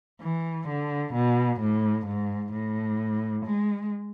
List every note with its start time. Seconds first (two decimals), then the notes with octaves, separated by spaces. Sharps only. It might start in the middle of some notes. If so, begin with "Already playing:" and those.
0.21 E3
0.68 D3
1.14 B2
1.60 A2
2.06 G#2
2.52 A2
3.45 G#3